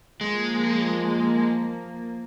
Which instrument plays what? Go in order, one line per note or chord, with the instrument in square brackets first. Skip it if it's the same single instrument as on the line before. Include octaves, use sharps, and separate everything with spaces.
[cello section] F3 A#3 [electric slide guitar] G#3